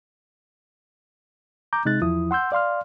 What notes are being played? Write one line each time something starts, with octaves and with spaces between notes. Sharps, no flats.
A#5 D6 G6
C3 G#3 D#4 F#6 A6
E2 F3 E4 D#6
F#5 C6 E6 G6
D5 F5 C6 F6